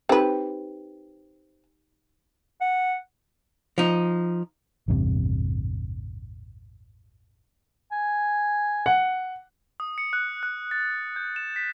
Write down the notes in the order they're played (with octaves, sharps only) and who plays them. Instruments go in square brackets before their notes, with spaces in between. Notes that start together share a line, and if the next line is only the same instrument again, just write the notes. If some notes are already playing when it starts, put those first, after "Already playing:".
[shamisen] C4 B4 [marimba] D#4 G4
[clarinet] F#5
[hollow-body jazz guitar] F3 D#4
[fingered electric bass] A1 E2 G2 C3
[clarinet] G#5
[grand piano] F#5
[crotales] D#6
C#7
F#6
F#6
A6
G6
E7
B6